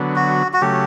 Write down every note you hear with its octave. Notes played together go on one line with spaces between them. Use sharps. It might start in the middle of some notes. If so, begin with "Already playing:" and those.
Already playing: D3 F#3 B3
F#4
F#4
C#3 F#3 A3 G4